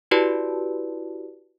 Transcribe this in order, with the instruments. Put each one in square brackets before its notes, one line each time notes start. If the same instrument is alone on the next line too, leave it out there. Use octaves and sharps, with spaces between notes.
[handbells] E4 F#4 G4 B4 D5 A5